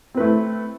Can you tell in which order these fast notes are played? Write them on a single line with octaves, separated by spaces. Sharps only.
C4 B4 A3 E4